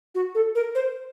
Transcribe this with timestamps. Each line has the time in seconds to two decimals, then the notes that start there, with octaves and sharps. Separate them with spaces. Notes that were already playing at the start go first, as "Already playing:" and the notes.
0.15 F#4
0.35 A4
0.55 A#4
0.75 C5